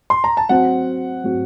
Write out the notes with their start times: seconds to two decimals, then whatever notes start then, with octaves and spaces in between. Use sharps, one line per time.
0.10 C6
0.24 A#5
0.37 A5
0.49 F#3 C4 F#4 F#5
1.24 F#3 C4 F#4